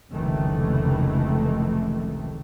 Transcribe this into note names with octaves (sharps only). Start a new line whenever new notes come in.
F1 C#2 D#3 E3 A3